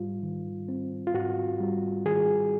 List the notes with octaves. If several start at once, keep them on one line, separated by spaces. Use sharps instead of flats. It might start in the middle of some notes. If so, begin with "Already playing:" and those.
Already playing: G#2 G3 F4
D#3
C4
F4
G#2 F#4
G3
D#3 G#4